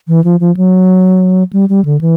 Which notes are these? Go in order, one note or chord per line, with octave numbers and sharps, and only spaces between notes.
E3
F3
F3
F#3
G3
G3
D3
E3